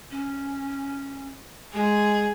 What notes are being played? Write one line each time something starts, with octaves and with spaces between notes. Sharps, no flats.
C#4
G#3 G#4